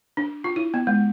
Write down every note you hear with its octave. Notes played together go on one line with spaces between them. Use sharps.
D4
F4
E4
B3
G#3